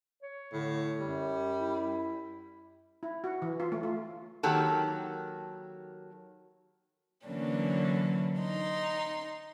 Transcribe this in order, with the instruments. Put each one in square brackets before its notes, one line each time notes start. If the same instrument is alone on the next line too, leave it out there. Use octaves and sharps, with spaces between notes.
[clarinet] C#5
[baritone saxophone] A2 [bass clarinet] D3
[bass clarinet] F#2 [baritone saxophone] G3
[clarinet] E4
[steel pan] E4
F#4
E3
F4
A3
F4
[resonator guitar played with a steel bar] D#3 F#3 A#3 F#4 G4 A4
[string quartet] D3 E3 F#3 A#3 C#4 D4
D#4 C6